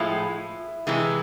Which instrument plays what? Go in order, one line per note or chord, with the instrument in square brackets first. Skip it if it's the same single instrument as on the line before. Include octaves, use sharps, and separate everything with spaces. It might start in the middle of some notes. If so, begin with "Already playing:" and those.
Already playing: [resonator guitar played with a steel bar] A2 F3 G#3 [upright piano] E4 E5
[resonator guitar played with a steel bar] C3 E3 G#3